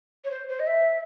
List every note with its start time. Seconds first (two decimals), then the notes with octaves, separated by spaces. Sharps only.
0.25 C#5
0.31 C5
0.49 C5
0.60 D#5
0.67 E5